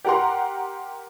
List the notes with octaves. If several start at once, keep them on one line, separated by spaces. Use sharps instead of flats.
G4 A#4 F#5 A#5 C6